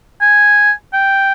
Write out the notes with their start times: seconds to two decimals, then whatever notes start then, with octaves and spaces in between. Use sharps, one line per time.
0.21 G#5
0.93 G5